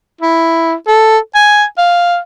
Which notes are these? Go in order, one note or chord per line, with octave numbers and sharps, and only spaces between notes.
E4
A4
G#5
F5